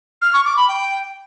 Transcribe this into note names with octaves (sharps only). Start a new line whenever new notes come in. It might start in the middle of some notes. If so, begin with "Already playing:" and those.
F6
C#6
D6
B5
G5